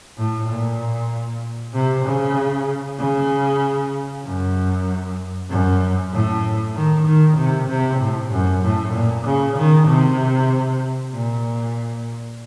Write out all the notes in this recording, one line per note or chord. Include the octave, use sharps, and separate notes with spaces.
A2
A#2
C3
C#3
C#3
F#2
F#2
A2
D#3
D#3
C3
C3
A2
F#2
A2
A#2
C#3
D#3
C3
A#2